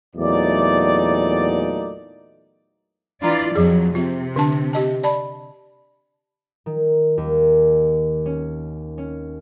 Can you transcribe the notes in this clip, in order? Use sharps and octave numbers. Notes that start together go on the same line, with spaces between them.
E2 A#2 F#3 A3 D#4 D5
E3 D4 F4 D5 A#5
F2 F3 F#3 G#4
C3 F4
D3 D4 A5
G4 D#5 A5
D5 A5 B5
D#3
D#2
C#4
C#4